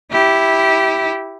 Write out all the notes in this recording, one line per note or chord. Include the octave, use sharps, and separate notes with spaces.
E4 G4